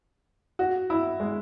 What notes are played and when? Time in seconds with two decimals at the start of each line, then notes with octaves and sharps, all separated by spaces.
0.59 F#4
0.90 E4
1.20 G#3